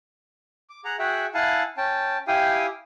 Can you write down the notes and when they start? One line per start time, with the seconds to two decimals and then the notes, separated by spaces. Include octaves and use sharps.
0.70 D6
0.85 G#4 F#5 A#5
0.99 F#4 G#4 E5 F#5 G5
1.34 E4 F5 F#5 G#5 A5
1.77 C#4 G5 A5
2.28 E4 G4 F5 G5 G#5 D#6